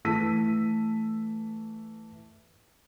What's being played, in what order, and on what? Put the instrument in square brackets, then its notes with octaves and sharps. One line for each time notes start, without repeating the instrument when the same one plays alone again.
[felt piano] E3 A3 A5 E6 B6 D#7